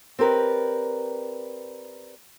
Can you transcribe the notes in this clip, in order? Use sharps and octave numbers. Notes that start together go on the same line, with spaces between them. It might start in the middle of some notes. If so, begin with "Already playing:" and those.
C4 G4 A#4 B4 D5